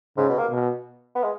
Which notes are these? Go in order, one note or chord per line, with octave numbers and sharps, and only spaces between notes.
G#2 C#3
B2
A#3
B2
B3
G#3